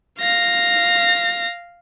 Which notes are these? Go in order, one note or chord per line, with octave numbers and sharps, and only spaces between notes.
F5 A#6